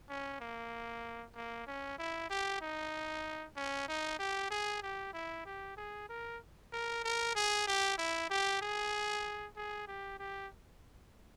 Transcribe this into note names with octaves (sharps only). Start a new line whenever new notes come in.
C#4
A#3
A#3
C#4
E4
G4
D#4
C#4
D#4
G4
G#4
G4
E4
G4
G#4
A#4
A#4
A#4
G#4
G4
E4
G4
G#4
G#4
G4
G4